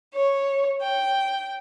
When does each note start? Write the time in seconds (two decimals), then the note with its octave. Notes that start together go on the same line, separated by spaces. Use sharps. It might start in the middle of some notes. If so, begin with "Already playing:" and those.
0.14 C#5
0.82 G5